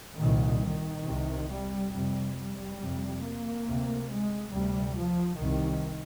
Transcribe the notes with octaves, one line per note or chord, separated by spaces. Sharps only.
C2 A#2 D#3
D#3
C2 C3
G3
F2 C3 G3
G3
F2 C3
A#3
D2 C3
G#3
D2 C3 G3
F3
C2 C3 D#3